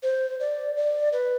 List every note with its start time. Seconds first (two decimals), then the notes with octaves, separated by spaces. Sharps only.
0.03 C5
0.40 D5
0.76 D5
1.13 B4